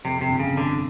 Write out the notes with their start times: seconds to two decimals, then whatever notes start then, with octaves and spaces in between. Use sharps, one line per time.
0.04 F2 C3
0.21 C3
0.28 G1
0.39 C#3
0.52 C3
0.57 D3